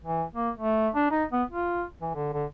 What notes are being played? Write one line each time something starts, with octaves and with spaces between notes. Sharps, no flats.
E3
A#3
A3
D4
D#4
B3
F4
E3
D3
D3